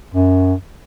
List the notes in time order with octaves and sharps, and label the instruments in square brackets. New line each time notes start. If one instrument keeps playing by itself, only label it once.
[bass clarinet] F#2